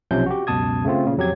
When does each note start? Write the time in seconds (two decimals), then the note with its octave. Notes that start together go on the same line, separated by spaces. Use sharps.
0.11 B1 C3 F3 C#4 G6
0.26 F#4 G4
0.47 C#2 F#2 B2 A5 D#6 G#6
0.85 C#3 A3 C4 F4
1.06 A#2 C#3
1.17 F2 F#3 G4 G#6